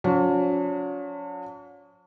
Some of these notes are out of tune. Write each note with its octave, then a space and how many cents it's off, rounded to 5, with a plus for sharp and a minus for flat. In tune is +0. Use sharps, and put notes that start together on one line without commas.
F#3 -45 C#4 +40